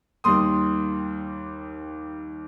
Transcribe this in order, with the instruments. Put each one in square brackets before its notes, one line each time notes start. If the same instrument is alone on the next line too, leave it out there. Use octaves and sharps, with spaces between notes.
[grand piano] D#2 D#3 G3 A#3 C6 D#6